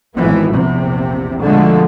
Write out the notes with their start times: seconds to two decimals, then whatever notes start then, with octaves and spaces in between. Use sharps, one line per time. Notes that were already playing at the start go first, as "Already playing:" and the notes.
0.19 G#1 A2 E3 B3
0.54 A#1 E2 C3
1.42 B2 D3 F3 G#3 A3